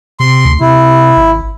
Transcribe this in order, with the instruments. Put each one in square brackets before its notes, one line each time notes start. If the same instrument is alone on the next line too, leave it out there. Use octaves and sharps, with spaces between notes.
[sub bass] C3 [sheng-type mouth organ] C6
[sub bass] D2
[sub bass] C3 [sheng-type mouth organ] E4
[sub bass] G#1